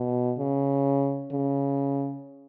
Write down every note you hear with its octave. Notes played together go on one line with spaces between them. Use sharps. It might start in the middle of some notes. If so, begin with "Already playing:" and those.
Already playing: B2
C#3
C#3